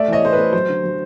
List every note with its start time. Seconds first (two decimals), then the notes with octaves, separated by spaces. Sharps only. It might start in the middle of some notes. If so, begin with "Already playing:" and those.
Already playing: A3 D5 E5
0.08 E3 C#5 D#5
0.23 A3 C5
0.33 B4
0.38 A3
0.53 F#3 C5
0.69 D3
0.84 F#3